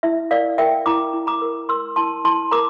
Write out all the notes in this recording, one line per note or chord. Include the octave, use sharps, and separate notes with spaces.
E4 E5
A#4 D5 F5
A#4 E5 G5
E4 A#5 D6
E4
A#5 D6
A#4
A#4 C6 E6
E4 A5 C6
E4 A5 C6
A#4 A#5 D6